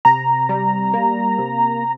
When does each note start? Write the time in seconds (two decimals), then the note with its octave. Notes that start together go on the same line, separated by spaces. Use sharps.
0.05 C3 A#5
0.49 G3
0.94 A#3
1.38 C3